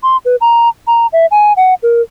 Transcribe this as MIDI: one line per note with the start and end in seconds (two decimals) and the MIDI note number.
0.03 0.17 84
0.25 0.36 71
0.41 0.69 82
0.87 1.07 82
1.13 1.26 76
1.31 1.53 80
1.57 1.74 78
1.83 2.02 70